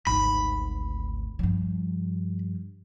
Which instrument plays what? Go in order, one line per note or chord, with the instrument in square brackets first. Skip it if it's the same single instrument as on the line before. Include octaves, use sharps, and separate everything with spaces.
[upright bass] G#1 D2 [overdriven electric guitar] B5
[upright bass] G2 F3